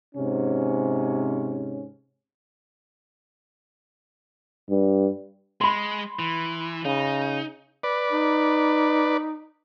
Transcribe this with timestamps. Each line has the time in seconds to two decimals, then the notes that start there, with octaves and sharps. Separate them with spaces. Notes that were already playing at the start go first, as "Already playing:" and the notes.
0.15 G#2 C3 C#4
4.69 G2
5.61 G#3 B5 C6
6.19 E3
6.85 C#3 D#4
7.83 B4 D5
8.11 D#4